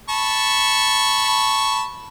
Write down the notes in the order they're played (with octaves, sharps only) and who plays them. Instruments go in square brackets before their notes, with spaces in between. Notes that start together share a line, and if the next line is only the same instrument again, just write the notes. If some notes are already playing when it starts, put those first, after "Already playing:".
[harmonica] A5 B5 C#6